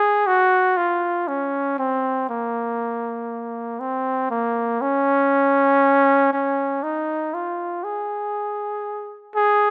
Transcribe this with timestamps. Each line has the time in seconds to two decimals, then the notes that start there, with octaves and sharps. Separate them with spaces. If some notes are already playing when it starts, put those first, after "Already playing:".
Already playing: G#4
0.27 F#4
0.77 F4
1.28 C#4
1.79 C4
2.29 A#3
3.80 C4
4.31 A#3
4.82 C#4
6.33 C#4
6.83 D#4
7.34 F4
7.84 G#4
9.35 G#4